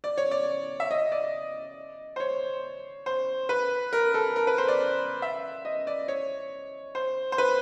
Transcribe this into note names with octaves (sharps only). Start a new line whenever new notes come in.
D5
C#5
D5
E5
D#5
D5
C5
C#5
C5
B4
A#4
A4
A#4
B4
C5
D5
E5
D#5
D5
C#5
C5
C5
B4